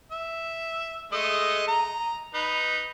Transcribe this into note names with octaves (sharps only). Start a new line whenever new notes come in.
E5
G#3 A3 D#5
A#5
D#4 B4